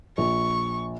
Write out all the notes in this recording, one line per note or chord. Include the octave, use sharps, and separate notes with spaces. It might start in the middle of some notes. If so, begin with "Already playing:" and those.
A#1 C#6